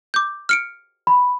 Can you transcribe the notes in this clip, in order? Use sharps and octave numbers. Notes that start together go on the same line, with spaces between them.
D6 G6
F6 C#7 D7
B5